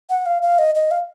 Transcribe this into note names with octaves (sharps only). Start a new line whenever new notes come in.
F#5
F5
F5
D#5
D#5
F5